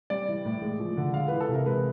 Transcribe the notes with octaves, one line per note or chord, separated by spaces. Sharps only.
G3 D5
E3
A2
G#3
F3
D3
G#3 F5
E3 B4
A4
C3
A#4
G#3 B4